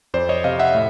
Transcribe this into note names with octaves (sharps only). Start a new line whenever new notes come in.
F2 C5 D5
C#5 D#5
C3 D#5 F5
E5 F#5
A2